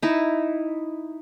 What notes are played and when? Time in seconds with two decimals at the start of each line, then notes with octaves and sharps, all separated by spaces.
0.02 D#4 E4